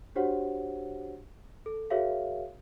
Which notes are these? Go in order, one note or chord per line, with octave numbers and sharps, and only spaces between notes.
D4 F#4 G4 C5 C#5 F#5
A4
F#4 G#4 A#4 C#5 E5 F5